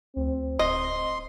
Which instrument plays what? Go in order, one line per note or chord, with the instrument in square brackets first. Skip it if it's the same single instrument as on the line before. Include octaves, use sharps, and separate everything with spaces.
[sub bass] D2 [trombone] C4
[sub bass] D1 [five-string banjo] D#5 [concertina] C6